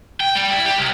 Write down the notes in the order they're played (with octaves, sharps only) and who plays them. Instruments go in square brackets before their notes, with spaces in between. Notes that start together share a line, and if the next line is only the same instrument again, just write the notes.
[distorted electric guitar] G5
G3
E4
G4
C2